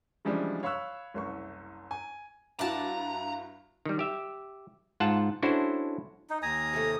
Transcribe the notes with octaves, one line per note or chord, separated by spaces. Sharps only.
C#3 E3 F3 G3 G#3 D4
C#5 F5 B5 C#6 E6 F#6
F#1 C2 C#6
G#5
G2 E4 F#4 D5 F5 A5 A#5
D#3 G3
G4 E5
G#2 F4 F#5 A5
C#4 D4 E4 F#4 A4 C5
D#4
D#2 G#5 A#5 D#6
C3 A3